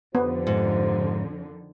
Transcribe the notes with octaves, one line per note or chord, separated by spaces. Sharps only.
F2 D3 D#3 B3 F4 G4 C5
G#2